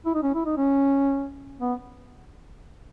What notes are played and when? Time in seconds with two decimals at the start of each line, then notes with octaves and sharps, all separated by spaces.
0.06 E4
0.14 D#4
0.23 C#4
0.35 E4
0.45 D#4
0.57 C#4
1.61 B3